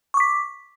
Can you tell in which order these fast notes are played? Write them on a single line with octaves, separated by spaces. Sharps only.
C#6 D6 B6